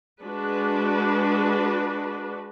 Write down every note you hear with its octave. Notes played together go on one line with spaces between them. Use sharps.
G#3 D4 F#4 B4